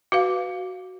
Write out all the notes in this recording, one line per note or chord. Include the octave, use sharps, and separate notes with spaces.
F#4 B4 F5